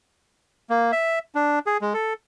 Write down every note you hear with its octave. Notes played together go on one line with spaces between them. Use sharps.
A#3
E5
D4
G#4
G#3
A4